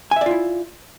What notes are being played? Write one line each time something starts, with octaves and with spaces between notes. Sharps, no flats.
E4 F4 D5 E5 G#5